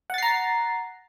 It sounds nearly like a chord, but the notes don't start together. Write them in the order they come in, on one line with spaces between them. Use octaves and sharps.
F#5 A6 C7 A#5